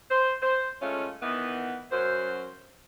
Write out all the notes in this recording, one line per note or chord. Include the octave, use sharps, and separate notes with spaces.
C5
C5
G#3 A3 C#4 F4
D#3 E3 B3
F#2 C5